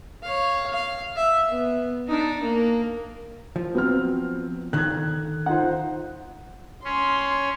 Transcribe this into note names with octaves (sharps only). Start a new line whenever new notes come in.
C#5 F5
F5
E5
B3
D4 D#4
A#3
F3
F#3 B3 C4 F6
D3 D#3 F#6 G#6
D#4 F4 C5 F#5
C#4 C6